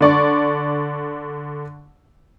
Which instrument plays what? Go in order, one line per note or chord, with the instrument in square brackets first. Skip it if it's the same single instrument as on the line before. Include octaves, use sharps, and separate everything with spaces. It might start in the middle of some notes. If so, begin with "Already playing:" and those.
[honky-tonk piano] D3 D5 C#6